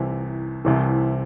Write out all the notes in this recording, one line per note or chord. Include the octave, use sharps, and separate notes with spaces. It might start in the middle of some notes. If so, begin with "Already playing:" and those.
Already playing: C2 C3 E3
C2 C3 E3